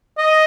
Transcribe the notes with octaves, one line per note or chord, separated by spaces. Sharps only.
D#5